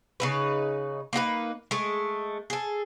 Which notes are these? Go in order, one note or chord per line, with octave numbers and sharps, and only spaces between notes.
C#3 D#4 B4
A#3 D#4 F#4 B4
G#3 A3
G#4 A4